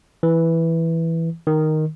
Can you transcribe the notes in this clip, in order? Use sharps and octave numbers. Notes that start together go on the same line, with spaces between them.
E3
D#3